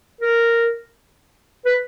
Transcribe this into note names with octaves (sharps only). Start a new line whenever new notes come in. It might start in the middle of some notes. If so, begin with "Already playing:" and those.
A#4
B4